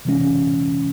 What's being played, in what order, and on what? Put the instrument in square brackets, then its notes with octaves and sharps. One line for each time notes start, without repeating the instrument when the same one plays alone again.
[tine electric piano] C3 E3 G#3 C#4